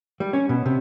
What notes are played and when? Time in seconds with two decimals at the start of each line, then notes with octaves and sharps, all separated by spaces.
0.20 G3
0.33 C#4
0.49 B2
0.66 C3